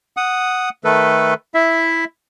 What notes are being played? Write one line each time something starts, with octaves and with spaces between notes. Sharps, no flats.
F#5 D#6
D#3 A3 A4 B4
E4 E5